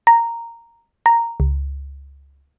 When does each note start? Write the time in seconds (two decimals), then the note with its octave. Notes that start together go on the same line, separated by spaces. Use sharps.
0.07 A#5
1.06 A#5
1.40 C#2